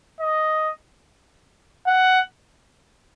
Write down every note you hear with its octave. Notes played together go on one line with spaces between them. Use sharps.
D#5
F#5